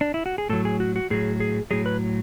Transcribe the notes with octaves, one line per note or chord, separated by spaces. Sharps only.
D4
E4
F#4
G#4
A2 F#3 A4
G#4
F#4
F#4
A2 F#3 G#4
G#4
A2 F#3 G#4
B4